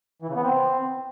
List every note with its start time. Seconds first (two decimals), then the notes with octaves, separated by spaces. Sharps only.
0.22 E3
0.29 C#3
0.36 B3
0.43 C4